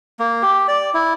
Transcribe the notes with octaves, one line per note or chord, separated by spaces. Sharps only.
A#3
G4
D5
E4